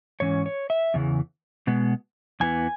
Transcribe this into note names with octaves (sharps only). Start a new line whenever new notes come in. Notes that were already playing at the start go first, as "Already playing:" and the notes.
G#2 E3 C#4 C#5
C#5
E5
E2 C#3 E3
B2 G#3 B3
E2 E3 B3 G#5